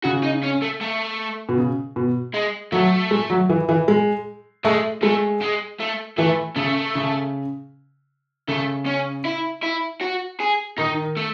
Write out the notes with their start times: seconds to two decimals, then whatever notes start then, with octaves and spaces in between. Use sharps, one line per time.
0.04 C#3 F#4
0.23 D#4
0.43 C#4
0.62 A3
0.81 A3
1.49 B2
1.58 C#3
1.96 B2
2.34 G#3
2.72 F#3 A3
3.11 G#3
3.30 F#3
3.49 E3
3.69 E3
3.88 G#3
4.64 G#3 A3
5.02 G#3 A3
5.41 G#3
5.80 A3
6.18 E3 A3
6.56 C#3 A3
6.95 C#3
8.48 C#3 A3
8.86 C#4
9.25 E4
9.63 E4
10.01 F#4
10.40 G#4
10.78 D#3 D#4
11.17 A3